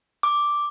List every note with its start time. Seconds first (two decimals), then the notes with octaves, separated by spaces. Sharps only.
0.23 D6